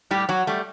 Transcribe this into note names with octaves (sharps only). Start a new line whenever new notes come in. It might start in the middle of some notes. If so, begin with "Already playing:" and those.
A2 G3 G4
F#3 F#4
G3 A3